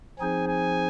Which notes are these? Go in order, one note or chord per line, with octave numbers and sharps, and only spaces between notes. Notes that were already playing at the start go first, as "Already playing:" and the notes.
F3 C4 D#4 G#4 C5 G#5
G#5